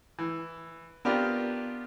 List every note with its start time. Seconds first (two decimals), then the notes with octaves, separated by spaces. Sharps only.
0.19 E3
1.05 B3 C4 D4 F4 G4 A#4